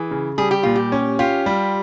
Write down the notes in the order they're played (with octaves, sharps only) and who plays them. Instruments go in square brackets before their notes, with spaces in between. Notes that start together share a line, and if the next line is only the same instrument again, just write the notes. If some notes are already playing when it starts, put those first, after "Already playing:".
Already playing: [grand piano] E3 [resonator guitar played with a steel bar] G#4
[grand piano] C#3
[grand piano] G3 [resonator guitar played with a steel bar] G#4
[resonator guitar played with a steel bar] G4
[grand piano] A#2 [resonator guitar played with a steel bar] F4
[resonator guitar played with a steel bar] G4
[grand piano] C#4
[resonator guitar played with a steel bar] F4 [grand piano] G4
[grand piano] G3